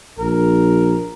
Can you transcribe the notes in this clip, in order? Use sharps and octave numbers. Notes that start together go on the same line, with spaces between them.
A#1 A#4